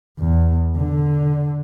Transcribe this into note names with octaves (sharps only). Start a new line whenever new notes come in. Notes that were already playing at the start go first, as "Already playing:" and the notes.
E2
D3